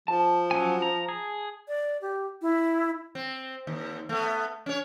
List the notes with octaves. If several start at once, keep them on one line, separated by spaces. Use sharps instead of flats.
F3 A5
F#3 C#4 G#5
A#5
G#4
D5
G4
E4
C4
D#2
A3 B3
C#4 C#5